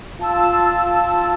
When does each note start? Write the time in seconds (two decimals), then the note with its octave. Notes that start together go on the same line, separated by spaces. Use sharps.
0.18 F4 A5 E6